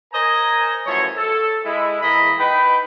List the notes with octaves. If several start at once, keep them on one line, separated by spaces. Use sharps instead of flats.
A#4 C5 C#5 D#5 G#5 A#5
F#2 E3 F3 A3 C#5
A4
G#3 E4
E3 G#3 A#3 D#5 B5
D#4 B4 G5